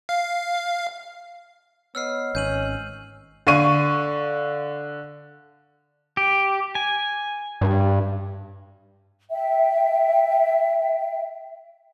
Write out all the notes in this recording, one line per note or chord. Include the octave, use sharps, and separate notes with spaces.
F5
B3 C#5 D#5 E6 F6 C7
G#1 C#4 G6 D#7 F#7
D3 F5 C#6 D#7
G4
G#5
G2
E5 G5